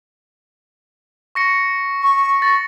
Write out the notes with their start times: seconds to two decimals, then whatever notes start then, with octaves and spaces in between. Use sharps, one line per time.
1.35 C#6 A#6 C#7
2.02 C#6
2.42 A6 A#6